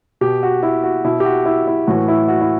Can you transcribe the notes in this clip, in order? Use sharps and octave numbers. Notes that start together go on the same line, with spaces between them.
B2 G4
F#4
E4
F#4
B2 E4
G4
F#4
E4
E4
A2 E3 F#4
E4
F#4
E4